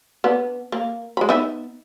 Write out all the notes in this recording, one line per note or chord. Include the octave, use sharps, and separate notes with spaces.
B3 D4
A#3
G#3 B5
B3 D#4 E5